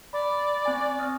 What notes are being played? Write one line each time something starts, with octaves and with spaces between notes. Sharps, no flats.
D5 B5
C4 G#5
C4 D#6 F6